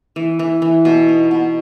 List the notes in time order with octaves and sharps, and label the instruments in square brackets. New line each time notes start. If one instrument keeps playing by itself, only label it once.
[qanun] E3
E3
E3
B2
D#4
B2